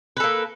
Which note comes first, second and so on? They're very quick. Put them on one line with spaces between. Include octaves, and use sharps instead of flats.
B4 A4 A#3